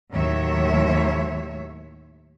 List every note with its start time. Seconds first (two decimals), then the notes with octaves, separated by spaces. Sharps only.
0.11 D#2 A2 F#3 C#5 E5